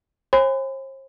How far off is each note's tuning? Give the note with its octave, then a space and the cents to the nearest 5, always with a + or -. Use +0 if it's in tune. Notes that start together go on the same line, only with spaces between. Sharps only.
C5 +45 G#5 -30 B5 +40